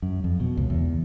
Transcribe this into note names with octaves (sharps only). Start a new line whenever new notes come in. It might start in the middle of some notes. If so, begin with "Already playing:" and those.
F#2
F2
B2
C#2
E2